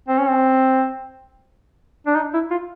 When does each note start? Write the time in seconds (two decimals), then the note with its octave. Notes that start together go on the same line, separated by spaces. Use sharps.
0.08 C4
0.19 C#4
0.29 C4
2.07 D4
2.15 D#4
2.34 E4
2.51 F4